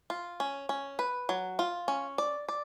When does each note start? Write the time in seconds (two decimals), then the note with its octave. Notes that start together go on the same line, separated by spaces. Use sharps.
0.10 F4
0.40 C#4
0.69 C#4
0.99 B4
1.29 F#3
1.59 F4
1.88 C#4
2.18 D5
2.49 D5